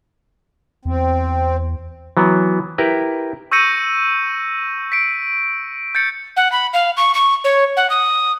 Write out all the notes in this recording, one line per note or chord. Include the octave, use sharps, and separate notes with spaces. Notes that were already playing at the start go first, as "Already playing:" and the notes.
E2 C4
E3 F#3 B3
E4 G4 A#4 B4
C#6 E6 G6 A#6 C#7 D#7
B6 C#7 D7
G6 A6 C#7
F#5
B5
F5
C#6
C#6
C#5
F#5
D#6